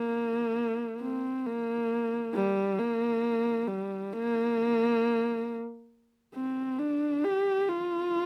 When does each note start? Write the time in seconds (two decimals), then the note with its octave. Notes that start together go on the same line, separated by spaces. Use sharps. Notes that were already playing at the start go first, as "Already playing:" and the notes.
Already playing: A#3
1.01 C4
1.46 A#3
2.34 G3
2.79 A#3
3.68 G3
4.13 A#3
6.35 C4
6.79 D4
7.24 G4
7.69 F4